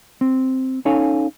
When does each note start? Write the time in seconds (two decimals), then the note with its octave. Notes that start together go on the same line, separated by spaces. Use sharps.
0.21 C4
0.85 C#4 D#4 A4 C#5 F5 G#5